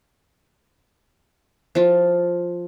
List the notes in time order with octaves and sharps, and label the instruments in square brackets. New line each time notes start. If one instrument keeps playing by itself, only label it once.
[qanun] F3 F4